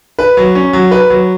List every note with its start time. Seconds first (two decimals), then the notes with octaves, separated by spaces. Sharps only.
0.19 B4
0.37 F#3
0.55 C#4
0.73 F#3
0.91 B4
1.10 F#3